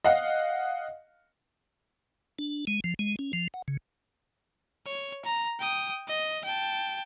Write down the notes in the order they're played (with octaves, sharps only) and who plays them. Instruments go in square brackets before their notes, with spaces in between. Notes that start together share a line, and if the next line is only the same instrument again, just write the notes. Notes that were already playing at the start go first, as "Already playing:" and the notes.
[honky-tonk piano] D#5 F5 F#5
[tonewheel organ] D4
G#3
F3
G#3
C#4
F3
F#5
C#3
[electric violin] C#5
A#5
G5 D#6
D#5
G5 A5